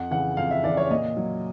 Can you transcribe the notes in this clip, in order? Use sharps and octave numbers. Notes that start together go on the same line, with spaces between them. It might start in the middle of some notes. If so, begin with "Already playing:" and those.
Already playing: F2 F#5
C#3 E3 F#5
F2 F5
E5
C#3 E3 D5
C#5
A#2 D#5
F#3